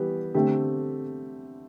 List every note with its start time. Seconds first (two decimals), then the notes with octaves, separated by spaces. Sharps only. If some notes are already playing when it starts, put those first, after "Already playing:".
Already playing: E3 G3 B3 G4
0.35 D3 A3 C4 G4